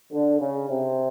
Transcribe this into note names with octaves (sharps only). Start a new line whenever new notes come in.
D3
C#3
C3